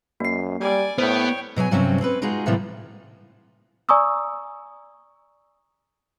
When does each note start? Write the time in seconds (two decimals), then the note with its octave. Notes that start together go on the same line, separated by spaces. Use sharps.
0.20 F#2 A#3 C7
0.60 G3 D5 G#5
0.98 A2 B3 C5 C#5 G5 D7
1.56 B2 F#3 C#5 G#5
1.71 G2 C3 F#3 G3 C4 C#4
2.01 C4 C#4 B4
2.22 G#3 D#4 F4 F#4 G#4
2.46 A2 C3 E3 F3 G3 A#3
3.89 D5 G#5 A#5 C#6 D#6 E6